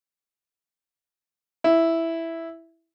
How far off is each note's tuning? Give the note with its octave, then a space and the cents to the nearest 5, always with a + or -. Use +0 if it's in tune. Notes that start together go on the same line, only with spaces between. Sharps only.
E4 +0